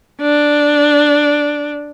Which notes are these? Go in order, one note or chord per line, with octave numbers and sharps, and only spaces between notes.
D4